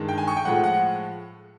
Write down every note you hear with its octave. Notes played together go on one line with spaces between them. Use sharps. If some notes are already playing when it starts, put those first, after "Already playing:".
Already playing: G2 D#3 G#3
G5
G#5
C#6
G5
A2 F3 G#3 F#5
F#5